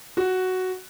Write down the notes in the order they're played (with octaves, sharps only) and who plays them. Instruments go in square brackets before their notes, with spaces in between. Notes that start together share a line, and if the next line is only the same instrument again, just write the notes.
[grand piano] F#4